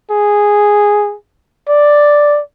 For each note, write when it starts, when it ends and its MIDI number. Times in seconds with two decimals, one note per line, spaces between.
0.11 1.15 68
1.69 2.41 74